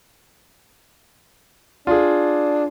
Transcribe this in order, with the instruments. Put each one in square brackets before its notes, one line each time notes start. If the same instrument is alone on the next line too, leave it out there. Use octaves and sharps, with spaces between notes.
[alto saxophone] D4 [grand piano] F4 G#4